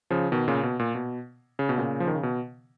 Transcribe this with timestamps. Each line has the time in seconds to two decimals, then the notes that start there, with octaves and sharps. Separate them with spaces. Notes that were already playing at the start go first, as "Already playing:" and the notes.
0.10 C#3 F3
0.32 B2 D#3
0.48 A#2 C#3
0.63 B2
0.79 A#2
0.95 B2
1.59 C#3
1.69 B2
1.77 A#2 C#3
2.00 F3
2.07 D#3
2.15 C#3
2.23 B2